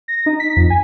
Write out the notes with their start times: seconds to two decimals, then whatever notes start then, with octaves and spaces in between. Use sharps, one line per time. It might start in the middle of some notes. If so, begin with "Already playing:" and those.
0.08 A#6
0.26 D#4
0.40 B6
0.56 F2
0.70 G#5